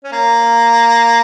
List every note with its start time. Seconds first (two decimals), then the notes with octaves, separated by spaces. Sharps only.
0.04 C#4
0.12 A#3